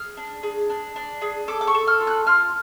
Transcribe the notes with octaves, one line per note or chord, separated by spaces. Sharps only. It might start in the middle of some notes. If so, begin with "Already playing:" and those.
Already playing: G#4 F6
D4
G#4
D4
D4
G#4
A4 D6
D6
C#6
A4
F6
F4
F#6
F4 F6